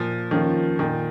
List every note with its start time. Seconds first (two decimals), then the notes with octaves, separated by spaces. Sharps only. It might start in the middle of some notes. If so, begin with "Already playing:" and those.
Already playing: A#2 F3
0.31 D#3 F3 A#3 C#4 F4
0.79 A#2 D#3